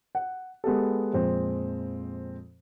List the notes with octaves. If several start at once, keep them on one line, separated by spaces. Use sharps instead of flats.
F#5
G#3 B3 G4 A4
F2 A#2 G#3 C4